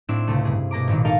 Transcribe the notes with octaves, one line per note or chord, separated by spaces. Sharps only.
A2 C4 D4 E4 E7
C#2 C3 A3
G2 G#4
B2 A#3 A#5 D6
G#1 A#2 D#3
D#4 A4 A#4 F5